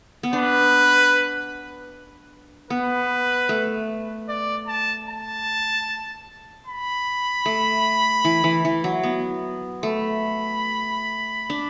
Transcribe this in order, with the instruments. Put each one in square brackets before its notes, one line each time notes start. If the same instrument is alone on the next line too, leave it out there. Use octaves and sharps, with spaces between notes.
[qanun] B3
[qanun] D4 [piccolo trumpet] B4
[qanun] B3 [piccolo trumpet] B4
[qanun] A3
[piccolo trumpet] D5
A5
A5
B5
[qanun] A3
E3
E3
E3
F#3
B3
[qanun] A3 [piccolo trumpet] B5
[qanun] D4